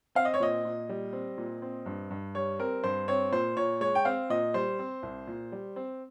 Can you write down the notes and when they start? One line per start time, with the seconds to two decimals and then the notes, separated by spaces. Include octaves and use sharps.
0.15 C4 F5
0.25 D#5
0.34 C#5
0.40 A#2 D#5
0.65 A#2
0.89 G3
1.13 C4
1.38 A#2
1.62 C4
1.86 G2
2.11 G2
2.35 G3 C#5
2.59 C4 A#4
2.84 G2 C5
3.08 C4 C#5
3.32 A#2 C5
3.57 A#2 C#5
3.81 G#3 C#5
3.95 G5
4.05 C4 F5
4.30 A#2 D#5
4.54 G3 C5
4.79 C4
5.03 C2
5.27 A#2
5.52 G3
5.76 C4